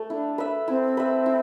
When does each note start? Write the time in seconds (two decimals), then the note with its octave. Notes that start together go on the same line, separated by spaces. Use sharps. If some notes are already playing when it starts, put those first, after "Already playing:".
Already playing: A3
0.10 D4 E4
0.38 B4 E5
0.68 C4 E4
0.97 B4 E5
1.26 E4